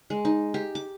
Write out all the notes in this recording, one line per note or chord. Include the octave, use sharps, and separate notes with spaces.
G#3
D#4
G4
D6